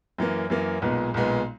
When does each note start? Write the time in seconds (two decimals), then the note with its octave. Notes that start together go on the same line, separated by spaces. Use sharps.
0.18 F#2 E3 A#3
0.50 F#2 E3 A#3
0.82 B1 A#2 G#3 B3
1.14 B1 A#2 G#3 B3